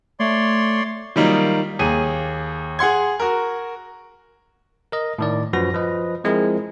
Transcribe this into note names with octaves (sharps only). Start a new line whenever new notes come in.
A3 C#5 D5 C6
D#3 F#3 G3 A#3 D#4 F4
D#2 G#4 D#7
G#4 F#5 C6 G#6
F#4 A#4
A#4 D#5
A2 D#3 D5
F#2 F3 F#4 B4 A#6
F3 B4 D#5
F3 G#3 C4 E4 G#4 A#4